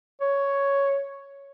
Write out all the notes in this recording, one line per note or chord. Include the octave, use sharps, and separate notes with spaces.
C#5